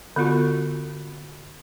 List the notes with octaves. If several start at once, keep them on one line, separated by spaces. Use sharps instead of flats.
D3 B3 F4 F#4